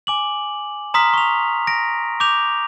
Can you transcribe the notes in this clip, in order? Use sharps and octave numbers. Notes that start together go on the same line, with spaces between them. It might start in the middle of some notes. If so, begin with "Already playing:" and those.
G#5 D6 F#7
A#5 C6 D#6 F6 B6
C#6 F7
A#6 D7
D6 G6 F7